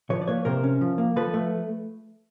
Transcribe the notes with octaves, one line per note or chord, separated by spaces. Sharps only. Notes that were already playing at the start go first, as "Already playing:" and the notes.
F3 B4 C#5
D5
A#3 B4 C#5
C3 A#4 C5
C#4
F3
A#3
F3 A4 B4
A3